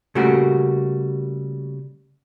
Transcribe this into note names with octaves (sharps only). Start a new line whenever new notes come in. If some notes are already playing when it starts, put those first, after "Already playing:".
C#3 G3 A3 A#3 F#4 G4